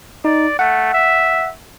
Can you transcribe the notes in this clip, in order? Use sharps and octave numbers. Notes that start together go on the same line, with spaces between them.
D#4 D5
A3 F#5
E5